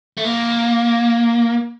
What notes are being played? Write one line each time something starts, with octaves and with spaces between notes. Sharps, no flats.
A3
A#3